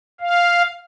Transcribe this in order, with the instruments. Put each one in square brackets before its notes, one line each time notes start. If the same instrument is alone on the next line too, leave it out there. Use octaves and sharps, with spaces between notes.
[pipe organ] F5